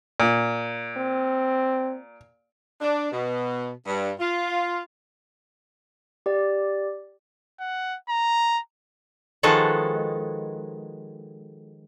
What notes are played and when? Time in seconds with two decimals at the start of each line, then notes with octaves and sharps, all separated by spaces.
0.20 A#2
0.97 C4
2.81 D4
3.12 B2
3.86 G2
4.20 F4
6.26 G4 D5
7.60 F#5
8.09 A#5
9.43 D#3 F3 G#3 F#4 A4 B4